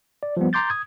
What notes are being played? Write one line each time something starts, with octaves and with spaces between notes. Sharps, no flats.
D5
F3 G3 B3
A#5 C6 D6 G6 A6
D#6 G#6